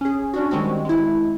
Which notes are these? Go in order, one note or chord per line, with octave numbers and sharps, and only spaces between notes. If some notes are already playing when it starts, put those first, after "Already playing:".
C#4 G#4
C#4 D4 F#4
D#3 G3 G#3 C4 F#4
G#3 E4